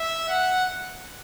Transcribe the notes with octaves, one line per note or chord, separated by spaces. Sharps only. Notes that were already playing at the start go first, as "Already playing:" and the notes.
Already playing: E5
F#5